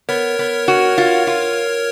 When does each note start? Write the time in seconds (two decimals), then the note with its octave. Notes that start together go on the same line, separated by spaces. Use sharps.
0.09 B3 A#4 C#5
0.39 B3
0.68 F#4
0.98 F4
1.27 F4